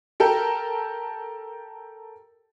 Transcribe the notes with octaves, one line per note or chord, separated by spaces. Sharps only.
G4 A4 A#4